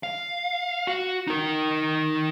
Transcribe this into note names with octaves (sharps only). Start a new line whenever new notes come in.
F5
F#4
D#4 A#4